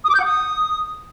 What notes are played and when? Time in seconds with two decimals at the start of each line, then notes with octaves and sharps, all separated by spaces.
0.04 D#6
0.10 D6
0.15 G6
0.20 F#5
0.25 D#6